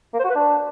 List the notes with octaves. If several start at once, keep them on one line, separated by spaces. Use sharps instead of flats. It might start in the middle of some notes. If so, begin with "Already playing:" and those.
A#3
C5
F#4
B4
D4